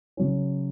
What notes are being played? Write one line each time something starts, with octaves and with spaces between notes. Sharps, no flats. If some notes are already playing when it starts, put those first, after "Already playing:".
C#3 F#3 C#4